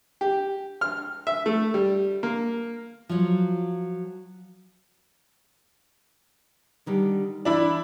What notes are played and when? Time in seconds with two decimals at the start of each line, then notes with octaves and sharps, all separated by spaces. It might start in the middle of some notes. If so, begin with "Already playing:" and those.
0.21 G4
0.81 F6
1.27 E5
1.46 A3
1.74 G3
2.23 A#3
3.09 F3 F#3
6.86 D3 D#3 G3
7.45 E3 D4 E4 B5